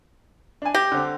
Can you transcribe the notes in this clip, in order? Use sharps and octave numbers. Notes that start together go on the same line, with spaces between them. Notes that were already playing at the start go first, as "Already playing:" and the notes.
D4 G#5
G4 A#6
D3 C4